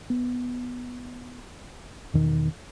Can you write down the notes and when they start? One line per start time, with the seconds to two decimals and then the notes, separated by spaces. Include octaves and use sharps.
0.10 B3
2.14 E2 B2 D#3